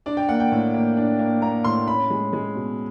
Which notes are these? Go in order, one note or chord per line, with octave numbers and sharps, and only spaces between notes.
D4 D5
G5
A#3 F#5
G5
A2
A#3
D4
A#3
A#3 A#5
A2 C6
C#4 B5
G#3
G#3
B2